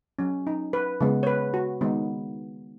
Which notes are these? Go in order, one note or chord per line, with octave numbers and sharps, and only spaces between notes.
F#3 C#4
D#4
B4
C#3 G#3 B3
C#5
B4
F#4
D#3 G#3 B3 D#4